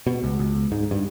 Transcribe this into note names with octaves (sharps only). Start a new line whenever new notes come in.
B2
C#2
C#2
G#2
G2